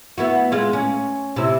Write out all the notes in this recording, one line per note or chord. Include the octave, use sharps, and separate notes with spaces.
B3 E4 F#4
G#3 F4
C#4
C3 E4